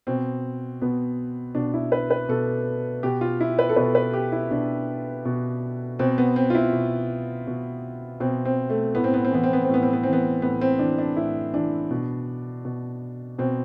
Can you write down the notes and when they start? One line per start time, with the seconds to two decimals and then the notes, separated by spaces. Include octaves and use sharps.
0.07 B2 C4
0.82 B2 B3
1.55 B2 D4
1.74 E4
1.92 B4
2.10 B4
2.29 B2 A4
3.03 B2 G4
3.21 F4
3.41 E4
3.59 B4
3.69 A4
3.76 B2 B4
3.95 B4
4.13 G4
4.32 E4
4.51 B2 D4
5.25 B2
5.99 B2 C4
6.18 B3
6.36 C4
6.50 F4
6.55 E4
6.72 B2
7.47 B2
8.20 B2 C4
8.45 C4
8.70 A3
8.95 A2 B3
9.04 C4
9.14 B3
9.25 C4
9.32 E3 B3
9.43 C4
9.53 B3
9.64 A2 C4
9.74 B3
9.83 C4
9.93 B3
10.03 E3 C4
10.13 B3
10.42 A2 B3
10.61 C4
10.79 E3 D4
10.98 D4
11.17 A2 E4
11.53 E3 D4
11.91 B2
12.65 B2
13.38 B2 C4